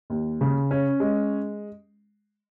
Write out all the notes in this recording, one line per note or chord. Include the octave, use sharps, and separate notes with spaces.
D#2
C#3
C#4
G#3